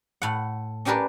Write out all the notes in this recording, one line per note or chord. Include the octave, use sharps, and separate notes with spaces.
A2 F#5
C#4 D4 G4 A#4 B4 D5